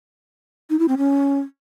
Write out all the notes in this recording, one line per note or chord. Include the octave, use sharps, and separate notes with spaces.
D#4
E4
C4
C#4